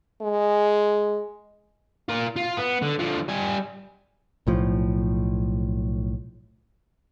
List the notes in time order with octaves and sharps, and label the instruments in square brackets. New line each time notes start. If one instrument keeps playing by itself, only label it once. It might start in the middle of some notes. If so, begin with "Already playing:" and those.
[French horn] G#3
[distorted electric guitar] F4 A#4
F4
B3
D3
D3 F3
G3 G#5
[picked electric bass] B1 A2 F3